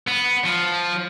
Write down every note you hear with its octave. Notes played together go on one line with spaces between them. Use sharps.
B3
F3